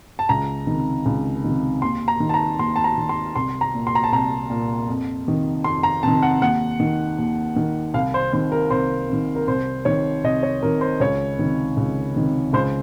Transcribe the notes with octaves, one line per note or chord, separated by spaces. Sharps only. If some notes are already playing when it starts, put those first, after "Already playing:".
A5
C#2 A#5
C3 D#3
C#2
C3 D#3
D#2 C6
A#5
D#3
A5
A#5
D#2 C6
A5
A#5
D#3
C6
C2 C6
A#5
A#2
C6
A#5
A5
C2 A#5
A#2
F2
C3 D#3
F2 C6
A#5
C3 D#3 A5
F#5
D#2 F#5
D#3
D#2
D#3
C2 F5
C5
C3 D#3 C5
A#4
C2 C5
C3 D#3
A#4
C2 C5
C3 D#3 C#5
C2 D#5
C#5
C3 D#3 A#4
C5
C#2 C#5
C3 D#3
C#2
C3 D#3
C#2 C5